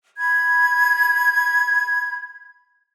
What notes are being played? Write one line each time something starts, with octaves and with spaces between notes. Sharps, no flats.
B5 G#6